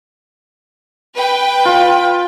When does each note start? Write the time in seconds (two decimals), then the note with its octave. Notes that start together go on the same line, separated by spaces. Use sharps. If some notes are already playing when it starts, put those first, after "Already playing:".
1.16 B4 G5
1.65 F4 B5